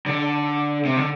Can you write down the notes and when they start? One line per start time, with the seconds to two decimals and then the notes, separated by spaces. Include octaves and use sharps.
0.06 D3
0.85 C3
0.96 D3